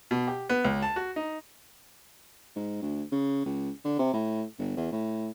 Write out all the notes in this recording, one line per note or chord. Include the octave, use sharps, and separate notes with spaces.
B2
G4
B3
C#2
A5
F#4
D#4
G#2
D2
C#3
C#2
D3
C3
A2
G1
E2
A2